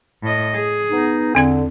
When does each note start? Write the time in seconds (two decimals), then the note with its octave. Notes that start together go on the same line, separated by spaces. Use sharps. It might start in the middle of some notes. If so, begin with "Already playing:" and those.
0.23 A2 D#5
0.54 G#4
0.90 B3 D#4
1.35 E2 D3 C4 G#6